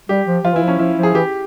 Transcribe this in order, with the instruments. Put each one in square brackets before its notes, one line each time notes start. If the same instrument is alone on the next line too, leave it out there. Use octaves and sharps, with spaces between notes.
[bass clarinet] G3 [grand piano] G4
[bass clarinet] F3
[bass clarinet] F3 [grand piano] F4
[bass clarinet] E3 [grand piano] E4
[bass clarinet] F3
[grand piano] C#4
[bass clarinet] F3 [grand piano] E4
[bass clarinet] F3
[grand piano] G#4
[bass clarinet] E3 [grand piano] G4